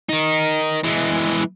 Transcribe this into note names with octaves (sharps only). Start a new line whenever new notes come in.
D#3 D#4
E3 G#3